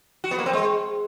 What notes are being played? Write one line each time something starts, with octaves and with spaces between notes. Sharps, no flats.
F#4
B3
A#3
C4
G#3